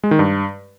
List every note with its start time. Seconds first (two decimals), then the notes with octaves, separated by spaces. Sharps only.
0.04 G#3
0.11 D#3
0.19 G2